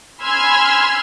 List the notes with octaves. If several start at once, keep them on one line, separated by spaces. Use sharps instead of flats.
G#5 B5 C6 E6 F6 G#6